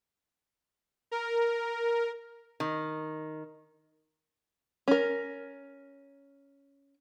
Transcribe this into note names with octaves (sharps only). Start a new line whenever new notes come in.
A#4
D#3
C#4 A#4